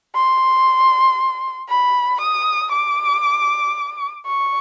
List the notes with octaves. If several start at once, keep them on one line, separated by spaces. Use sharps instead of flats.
C6
B5
D#6
D6
C#6